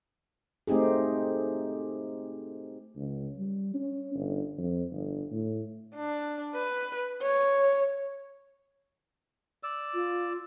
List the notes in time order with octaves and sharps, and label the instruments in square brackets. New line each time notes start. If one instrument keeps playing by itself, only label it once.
[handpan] A3 C4 D#4 G4 G#4
[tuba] C#2
G3
C#4
G1
F2
G1
A2
[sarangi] D4
B4
C#5
[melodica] D5 E6
[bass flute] F4